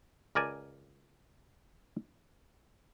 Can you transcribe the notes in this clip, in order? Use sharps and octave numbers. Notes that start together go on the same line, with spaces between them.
C#2 A#4 D5 G#5 A5